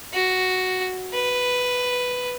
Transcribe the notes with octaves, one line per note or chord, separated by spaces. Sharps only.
F#4
B4